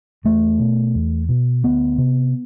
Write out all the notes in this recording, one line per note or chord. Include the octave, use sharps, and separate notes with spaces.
E2 A3
B2
E2
B2
D2 B3
C3